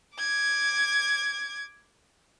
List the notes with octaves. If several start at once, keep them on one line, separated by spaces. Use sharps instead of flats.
D6 G#6